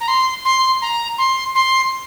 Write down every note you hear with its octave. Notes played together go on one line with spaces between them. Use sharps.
A#5
C6
C6
A#5
C6
C6